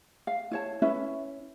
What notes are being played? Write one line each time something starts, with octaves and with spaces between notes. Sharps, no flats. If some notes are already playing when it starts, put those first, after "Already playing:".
F5
E4 C#5 A5
C#4 E4 B4 E5